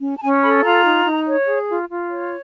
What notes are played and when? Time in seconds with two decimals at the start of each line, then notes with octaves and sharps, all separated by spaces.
0.01 C#4
0.17 A5
0.22 C#4 G#5
0.43 A4 B5
0.63 F4 A#5
0.85 D#4
1.05 D#4
1.27 C#5
1.47 G#4
1.68 F4
1.89 F4
2.10 C#5